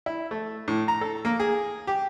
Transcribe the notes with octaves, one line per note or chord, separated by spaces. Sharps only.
E4
A3
A2
A#5
A4
A#3
G#4
G4